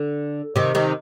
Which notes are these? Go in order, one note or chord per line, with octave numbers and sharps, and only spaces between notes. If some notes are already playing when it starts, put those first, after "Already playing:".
Already playing: D3
C3 D#3
C3 D#3